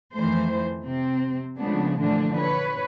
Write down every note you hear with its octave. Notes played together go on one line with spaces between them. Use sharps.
F2 D#3 E3 A3 C5
C3 C4
C#3 F3 G#3 A3 B3 D4
A#2 D3 E3 F3 A3 D4
B4 C#5